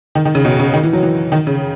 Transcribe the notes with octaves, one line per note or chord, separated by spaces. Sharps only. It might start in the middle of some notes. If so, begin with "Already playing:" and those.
D#3
D#3
C#3
B2
C#3
D#3
E3
F#3
E3
D#3
C#3